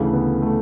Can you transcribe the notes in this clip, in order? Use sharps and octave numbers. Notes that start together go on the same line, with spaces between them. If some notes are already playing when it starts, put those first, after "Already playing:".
Already playing: D2 C#3 E3 A3
B3
A3